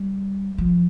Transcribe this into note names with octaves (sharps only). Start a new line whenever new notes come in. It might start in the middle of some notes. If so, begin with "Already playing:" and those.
Already playing: G3
F3